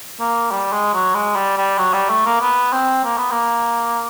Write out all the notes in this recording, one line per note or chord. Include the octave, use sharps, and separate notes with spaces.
A#3
G3
G#3
F#3
G#3
G3
G3
F#3
G3
A3
A#3
B3
C4
A#3
B3
A#3